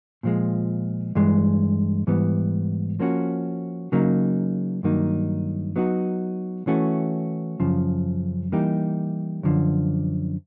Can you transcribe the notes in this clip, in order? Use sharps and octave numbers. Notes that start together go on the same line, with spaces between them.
A#2 F3 G#3
G2 E3 G#3
G#2 E3 G3 B3
F3 A#3 C#4 F#4
C#3 F#3 A#3 D#4
G2 D#3 F#3 A#3 D#4
F#3 B3 D#4 F#4
E3 A3 C#4 F#4
F#2 C#3 F3
E3 G3 A#3 D#4 G4
F#2 D3 F3